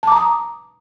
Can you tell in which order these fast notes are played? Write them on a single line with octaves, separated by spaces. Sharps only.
A5 D6 A#5 D#6